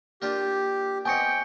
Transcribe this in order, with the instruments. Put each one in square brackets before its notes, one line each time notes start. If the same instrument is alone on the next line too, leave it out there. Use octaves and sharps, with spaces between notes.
[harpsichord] A#3 D4 F4 [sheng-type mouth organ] G4
[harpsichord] B3 C4 D#4 [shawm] G5 [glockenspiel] G#5 C#6 C#7